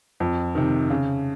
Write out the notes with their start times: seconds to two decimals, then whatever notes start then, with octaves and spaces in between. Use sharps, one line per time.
0.20 F2
0.55 C3 D#3
0.90 C#3